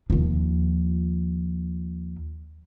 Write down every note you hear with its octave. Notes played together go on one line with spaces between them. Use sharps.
D#2 F3